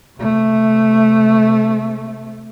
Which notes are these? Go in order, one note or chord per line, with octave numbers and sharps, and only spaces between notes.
C3 A3